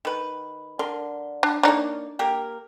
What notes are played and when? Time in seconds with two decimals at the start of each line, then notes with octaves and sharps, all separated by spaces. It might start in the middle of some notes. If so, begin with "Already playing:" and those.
0.05 D#3 B4
0.79 D3 A#4 C6
1.43 D4
1.63 A#3 D4 D#4 C#5 D5
2.19 A#3 G4 A#4